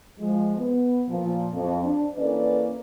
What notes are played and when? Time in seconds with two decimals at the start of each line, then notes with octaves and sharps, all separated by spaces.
0.19 F3 G#3
0.57 B3
1.08 A#2 F3
1.53 F2
1.82 D4
2.16 E3 A#3 C#4 A4 B4 D5